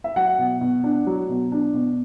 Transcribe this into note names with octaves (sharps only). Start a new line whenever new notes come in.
E5
F#3 F#5
B2
B2
D4
F#3
B2
D4
B2